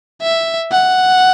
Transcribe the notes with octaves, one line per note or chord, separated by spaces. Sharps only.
E5
F#5